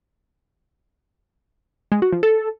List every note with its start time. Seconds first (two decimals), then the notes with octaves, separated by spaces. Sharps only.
1.92 G#3
2.02 F#4
2.12 F3
2.23 A4